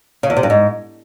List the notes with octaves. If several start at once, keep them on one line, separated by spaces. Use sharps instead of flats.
C#3
E2
C3
G2
G#2